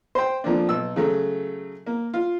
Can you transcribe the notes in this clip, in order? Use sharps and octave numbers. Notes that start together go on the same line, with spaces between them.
C5 G5
F2 F3 A#3 D4
B1 E6
C#3 F#3 A3
A#3
F4